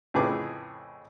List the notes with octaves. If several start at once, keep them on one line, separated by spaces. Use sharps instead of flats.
F2 A2 C#3 G#4 B4 D6